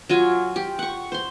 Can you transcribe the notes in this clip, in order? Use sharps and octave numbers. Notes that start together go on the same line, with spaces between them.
F#3 F4 G#5
G4
F#5 C#6
C5 C6